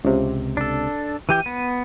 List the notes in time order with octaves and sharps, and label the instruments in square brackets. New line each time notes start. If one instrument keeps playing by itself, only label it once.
[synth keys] C#2 C3
[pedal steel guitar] D4 A4
[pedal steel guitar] E3 G4 G5 [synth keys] D#7
[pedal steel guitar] B3